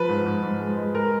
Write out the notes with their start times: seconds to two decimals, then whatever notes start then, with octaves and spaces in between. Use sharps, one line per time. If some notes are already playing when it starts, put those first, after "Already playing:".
Already playing: F3 B4
0.09 G#2
0.26 G#2
0.43 G#2
0.60 G#3
0.77 G#3
0.95 G#3 A#4